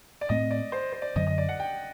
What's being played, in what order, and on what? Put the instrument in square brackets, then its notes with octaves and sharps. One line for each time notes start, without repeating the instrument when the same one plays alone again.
[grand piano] D5
[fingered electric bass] A2 A3 C4 [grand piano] D#5
[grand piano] D5
C5
C5
D5
[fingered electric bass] F#2 D3 F#3 [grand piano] D#5
[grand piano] D#5
D5
F#5
G5